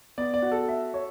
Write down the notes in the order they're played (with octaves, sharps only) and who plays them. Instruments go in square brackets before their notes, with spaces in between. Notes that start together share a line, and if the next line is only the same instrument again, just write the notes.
[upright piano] B3 [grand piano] D5
[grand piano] D5
[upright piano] F#4
[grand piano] A4
[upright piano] E5
C#5